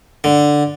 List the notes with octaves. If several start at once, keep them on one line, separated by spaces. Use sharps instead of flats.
D3